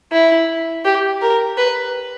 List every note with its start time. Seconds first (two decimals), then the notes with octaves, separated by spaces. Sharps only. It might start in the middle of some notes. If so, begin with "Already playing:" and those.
0.12 E4
0.85 G4
1.21 A#4
1.58 B4